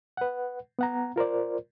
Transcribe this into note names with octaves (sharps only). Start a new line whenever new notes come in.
B4 F#5
B3 F#5 A#5
F4 A#4 C5 D5